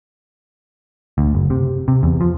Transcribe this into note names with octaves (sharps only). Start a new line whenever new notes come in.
D2
F#1
C3
C3
E2
F3